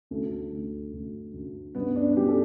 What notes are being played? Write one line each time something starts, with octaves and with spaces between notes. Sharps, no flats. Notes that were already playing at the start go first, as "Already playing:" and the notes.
D2 A3
D2
D2
D2
G2 B3
D4
G2 G4
A4